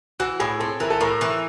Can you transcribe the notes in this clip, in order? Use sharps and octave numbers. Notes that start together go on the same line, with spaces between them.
E3 F#4
A2 G#4
C4 A4
E3 A#4
A4
A2 A#4
E3